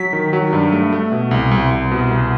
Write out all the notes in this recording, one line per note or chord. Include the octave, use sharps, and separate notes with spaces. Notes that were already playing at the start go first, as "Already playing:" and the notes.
Already playing: F#3 B6
D#3
F#3
G2
A3
A3
B2
C2
C2
C2
B2
C2